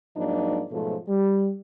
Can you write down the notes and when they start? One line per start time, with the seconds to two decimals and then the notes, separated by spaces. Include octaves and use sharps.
0.16 G#2 F3 F#3 A#3 D4 D#4
0.72 G#2 B2 F3 F#3 A3
1.08 G3